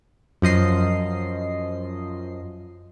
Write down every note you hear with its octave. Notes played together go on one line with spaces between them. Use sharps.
F#2 F3 D#5 C7